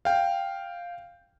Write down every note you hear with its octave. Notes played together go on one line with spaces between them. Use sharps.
F5 G5